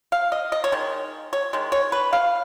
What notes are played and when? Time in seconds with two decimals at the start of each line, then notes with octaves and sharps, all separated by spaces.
0.12 F5
0.32 D#5
0.52 D#5
0.64 C#5
0.72 D#3 G#3
1.33 C#5
1.53 D#3 G#3
1.72 C#5
1.92 B4
2.13 F5